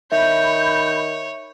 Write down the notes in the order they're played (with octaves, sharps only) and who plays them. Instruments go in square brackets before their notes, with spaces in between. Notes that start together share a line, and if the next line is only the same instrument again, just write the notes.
[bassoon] D#3 [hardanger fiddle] C#5 [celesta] E5 [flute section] B5 G6